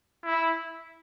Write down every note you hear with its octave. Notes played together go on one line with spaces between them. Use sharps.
E4